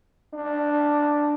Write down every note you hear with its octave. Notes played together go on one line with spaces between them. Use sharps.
D4